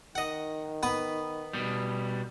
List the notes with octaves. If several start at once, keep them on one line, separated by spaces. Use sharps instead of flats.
D#3 D#5 F#5
B3 B4 B5
B2 G3